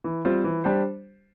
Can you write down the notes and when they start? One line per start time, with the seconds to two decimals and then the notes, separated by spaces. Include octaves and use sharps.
0.04 E3
0.25 G3 C4 F4 C5
0.44 E3
0.64 G3 D4 G4 C5